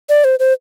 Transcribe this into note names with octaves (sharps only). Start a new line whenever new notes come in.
D5
C5
C5